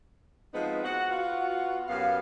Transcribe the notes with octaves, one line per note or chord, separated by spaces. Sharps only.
F3 G#3 B3 C4 D#4
F#4 F#5
B3 F4 F#4
F#2 B3 G4 F5